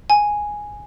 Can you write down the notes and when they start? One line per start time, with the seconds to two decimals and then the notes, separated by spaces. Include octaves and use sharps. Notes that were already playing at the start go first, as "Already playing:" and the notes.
0.10 G#5